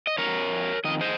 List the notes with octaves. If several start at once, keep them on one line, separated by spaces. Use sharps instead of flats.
D#5
F2 D#3 A#4 C#5
F2 D#3 D#5
C5 D#5